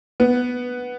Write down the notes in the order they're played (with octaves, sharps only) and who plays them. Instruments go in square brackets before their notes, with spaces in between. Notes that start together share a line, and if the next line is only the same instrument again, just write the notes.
[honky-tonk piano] B3